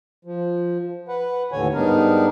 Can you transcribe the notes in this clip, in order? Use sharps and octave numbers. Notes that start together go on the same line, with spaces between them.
F3
B4 F#5
D#2 A2 D3 E3 C#5 G#5
G#2 G3 B3 D4 D#4 A#4